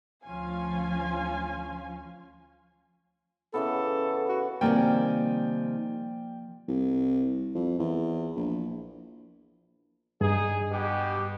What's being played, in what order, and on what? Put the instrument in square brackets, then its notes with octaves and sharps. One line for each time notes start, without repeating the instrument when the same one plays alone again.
[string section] D2 F3 C#4 F4 F5 G#5
[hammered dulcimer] C#3 E3 B3 [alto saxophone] A4
[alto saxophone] F#4
[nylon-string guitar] C3 D#3 G3 [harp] F3 A#3 G#5 [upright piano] D5 G5
[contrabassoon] C2
F2
E2
A#1
[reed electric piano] G2 [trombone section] D#4 G#4
[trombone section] B2 G4